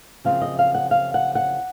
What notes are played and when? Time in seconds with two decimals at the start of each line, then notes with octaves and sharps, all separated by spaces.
0.25 F#2 C#3 F3 C4 F4 F5
0.42 D#5
0.59 F5
0.74 F#5
0.91 F5
1.14 F#5
1.35 F#5